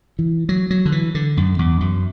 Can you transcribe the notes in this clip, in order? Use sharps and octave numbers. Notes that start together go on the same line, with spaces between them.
E3
F#3
F#3
D3
E3
D3
F#2
E2
F#2